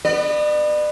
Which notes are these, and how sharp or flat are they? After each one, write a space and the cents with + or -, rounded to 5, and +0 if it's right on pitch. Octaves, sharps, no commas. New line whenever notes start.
B3 +0 D5 +40